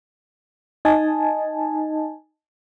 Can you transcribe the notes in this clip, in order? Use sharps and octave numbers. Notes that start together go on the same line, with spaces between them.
D#4 D#5 G#5 A5